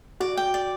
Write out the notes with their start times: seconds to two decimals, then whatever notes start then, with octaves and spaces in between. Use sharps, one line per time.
0.20 F#4 D5
0.37 G5
0.54 D5